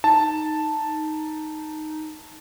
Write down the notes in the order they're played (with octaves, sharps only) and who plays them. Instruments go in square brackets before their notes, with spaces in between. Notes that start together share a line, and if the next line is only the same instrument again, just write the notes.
[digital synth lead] D#4 [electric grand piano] A5